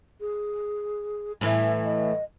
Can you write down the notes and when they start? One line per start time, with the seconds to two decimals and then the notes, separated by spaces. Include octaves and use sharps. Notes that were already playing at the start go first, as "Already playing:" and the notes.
0.21 G#4
1.41 A2 E3 E5
1.85 D#5